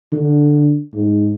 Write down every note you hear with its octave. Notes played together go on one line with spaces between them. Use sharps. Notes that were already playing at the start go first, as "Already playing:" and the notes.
D3
G#2